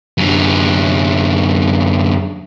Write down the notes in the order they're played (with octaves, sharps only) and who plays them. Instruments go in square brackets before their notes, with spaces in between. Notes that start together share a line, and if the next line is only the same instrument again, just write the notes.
[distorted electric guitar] F#2 D3